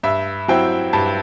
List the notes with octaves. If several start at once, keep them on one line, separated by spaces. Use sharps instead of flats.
G2 E5
F#3 C4 E4 G5
G2 A5